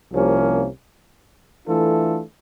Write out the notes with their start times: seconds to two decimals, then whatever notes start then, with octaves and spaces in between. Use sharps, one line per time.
0.12 C2 C3 F3 A#3 C#4
1.67 E3 A3 D4 F4 A4